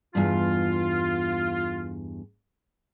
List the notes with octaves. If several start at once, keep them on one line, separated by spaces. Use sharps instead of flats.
E2 G2 F4